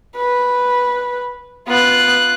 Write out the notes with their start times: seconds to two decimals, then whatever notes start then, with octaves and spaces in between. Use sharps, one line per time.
0.17 B4
1.68 B3 F4 F#6